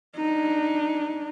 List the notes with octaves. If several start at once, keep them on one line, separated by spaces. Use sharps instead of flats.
D4 D#4